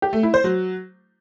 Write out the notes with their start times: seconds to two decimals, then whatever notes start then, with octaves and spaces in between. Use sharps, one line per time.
0.02 G4
0.13 A3
0.23 E4
0.34 C5
0.44 F#3